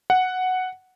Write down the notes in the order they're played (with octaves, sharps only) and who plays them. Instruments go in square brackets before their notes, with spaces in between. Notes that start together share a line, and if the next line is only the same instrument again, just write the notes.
[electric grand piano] F#5